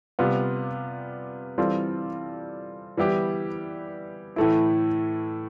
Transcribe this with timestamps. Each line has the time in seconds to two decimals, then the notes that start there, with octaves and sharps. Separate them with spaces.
0.19 C3 G3 B3 F4
1.58 E3 G3 C4 F4 A4
2.97 E3 G3 B3 E4 G4
4.36 A2 E3 A3 E4